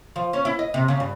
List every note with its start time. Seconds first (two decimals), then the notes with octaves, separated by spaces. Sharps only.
0.16 F3
0.33 C#4
0.45 E4
0.59 D#5
0.74 C3
0.88 C#3
1.00 G2